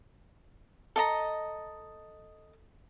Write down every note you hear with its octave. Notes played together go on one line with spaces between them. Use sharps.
A4 D#5 A#5